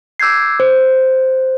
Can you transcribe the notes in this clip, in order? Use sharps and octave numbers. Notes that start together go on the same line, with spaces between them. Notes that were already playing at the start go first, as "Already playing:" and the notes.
D6 E6 G6 G#6 C7
C5